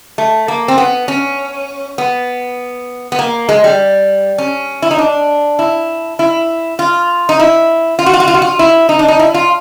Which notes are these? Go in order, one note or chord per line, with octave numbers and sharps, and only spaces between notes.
A3
A#3
C4
B3
C#4
B3
B3
A#3
G#3
G3
C#4
E4
D#4
D4
E4
E4
F4
D#4
E4
F4
F#4
F4
F#4
F4
F#4
F4
E4
D#4
D4
D#4
E4
F4